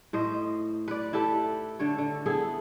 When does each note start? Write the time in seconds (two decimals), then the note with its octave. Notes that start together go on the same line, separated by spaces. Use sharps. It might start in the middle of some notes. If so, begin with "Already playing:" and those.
0.13 A2 C5 D#5
0.88 B4 D5
1.13 E4 G4 A4 B4
1.79 D3 A4 C#5
1.98 D3
2.26 B3 E4 G#4 A4